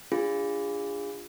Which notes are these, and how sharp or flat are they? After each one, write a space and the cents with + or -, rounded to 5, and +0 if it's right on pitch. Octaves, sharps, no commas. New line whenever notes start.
D4 +0 F4 +0 G#4 -25